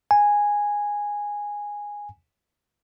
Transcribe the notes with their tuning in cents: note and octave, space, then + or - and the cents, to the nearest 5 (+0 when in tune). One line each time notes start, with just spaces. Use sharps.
G#5 -10